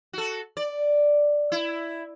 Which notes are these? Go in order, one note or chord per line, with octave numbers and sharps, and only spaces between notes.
F#4 A4
D5
E4